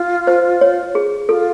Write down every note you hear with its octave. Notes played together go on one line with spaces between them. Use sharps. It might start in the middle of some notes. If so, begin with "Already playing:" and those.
Already playing: F4
C5
C#5
G#4
F4 A4